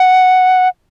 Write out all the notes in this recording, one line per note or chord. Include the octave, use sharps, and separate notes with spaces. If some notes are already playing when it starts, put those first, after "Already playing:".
Already playing: F#5